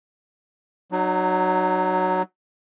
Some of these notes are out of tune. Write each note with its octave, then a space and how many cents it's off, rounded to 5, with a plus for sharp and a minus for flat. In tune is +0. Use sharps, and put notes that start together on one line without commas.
F#3 +0 D#4 -40